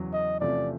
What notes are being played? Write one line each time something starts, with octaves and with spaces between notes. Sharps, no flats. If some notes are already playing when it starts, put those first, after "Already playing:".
Already playing: E2 C#3 F#3
D#5
E2 C3 F3 A3 C#4 D5